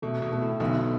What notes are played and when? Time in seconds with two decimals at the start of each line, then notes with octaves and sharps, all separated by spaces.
0.02 B2 A3
0.22 B2
0.32 A3
0.42 A2
0.60 B1 B2 D3